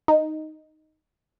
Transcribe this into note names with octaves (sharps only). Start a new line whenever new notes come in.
D#4